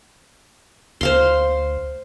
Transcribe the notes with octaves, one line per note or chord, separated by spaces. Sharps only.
D2 C5 F5 C6